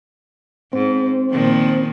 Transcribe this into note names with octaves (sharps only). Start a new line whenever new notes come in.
G#2 C4
A#2 D#3 F3